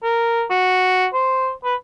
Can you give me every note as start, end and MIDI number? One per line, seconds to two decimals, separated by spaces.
0.04 0.44 70
0.50 1.07 66
1.14 1.51 72
1.64 1.75 71